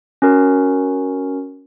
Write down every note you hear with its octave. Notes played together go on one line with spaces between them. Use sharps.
C#4 F#4 A#4